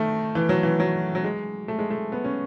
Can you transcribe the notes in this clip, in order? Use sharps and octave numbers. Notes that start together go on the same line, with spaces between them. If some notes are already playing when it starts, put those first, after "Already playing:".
Already playing: D#3 A3
E3
F#3
E3
F#3
F#3
G#3
A3
G#3
A3
B3
C#4